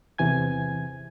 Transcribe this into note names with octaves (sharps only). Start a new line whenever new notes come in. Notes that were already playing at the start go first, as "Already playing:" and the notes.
E2 C3 E3 G#5 G#6